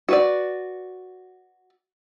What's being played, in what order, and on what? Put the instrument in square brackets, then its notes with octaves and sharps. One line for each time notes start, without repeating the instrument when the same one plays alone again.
[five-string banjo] F#4 B4 D5